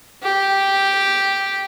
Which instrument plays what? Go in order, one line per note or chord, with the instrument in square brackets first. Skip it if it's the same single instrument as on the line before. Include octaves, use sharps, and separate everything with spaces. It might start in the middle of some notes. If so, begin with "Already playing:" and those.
[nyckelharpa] G4